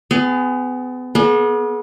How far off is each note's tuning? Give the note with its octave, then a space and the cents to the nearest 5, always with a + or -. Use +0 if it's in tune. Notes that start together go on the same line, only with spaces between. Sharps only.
B3 +35 G#4 +0
B3 -35 G#4 +35